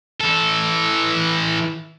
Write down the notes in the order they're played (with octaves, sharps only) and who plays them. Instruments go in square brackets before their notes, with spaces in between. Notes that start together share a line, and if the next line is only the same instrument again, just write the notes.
[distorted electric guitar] E3 A4